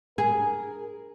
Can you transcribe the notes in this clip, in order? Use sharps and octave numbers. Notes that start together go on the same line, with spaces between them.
G#4 A#4